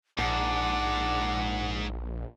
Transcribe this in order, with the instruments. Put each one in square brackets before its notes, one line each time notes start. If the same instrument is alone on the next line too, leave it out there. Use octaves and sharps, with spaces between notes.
[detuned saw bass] A#1 [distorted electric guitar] G#2 [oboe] D4 [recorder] F#5